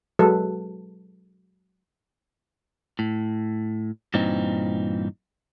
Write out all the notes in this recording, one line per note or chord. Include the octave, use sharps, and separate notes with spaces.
F#3 G#3 A4 B4
A2
G2 A#2 E3 C4 D#4